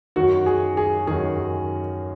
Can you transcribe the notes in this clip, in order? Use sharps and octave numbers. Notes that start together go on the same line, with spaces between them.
F#2 D#3 F#4
G#4
G#4
F#2 D#3 G#4